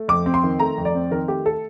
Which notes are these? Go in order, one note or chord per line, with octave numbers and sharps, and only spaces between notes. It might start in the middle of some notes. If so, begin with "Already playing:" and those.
Already playing: A3
F2 D6
C4
C6
D#3
A3 A#5
F2
D5
C4
D#3 A#4
A3 G4
A4